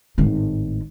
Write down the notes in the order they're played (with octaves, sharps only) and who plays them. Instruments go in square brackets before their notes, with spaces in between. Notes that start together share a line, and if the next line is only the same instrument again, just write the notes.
[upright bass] G#1 A2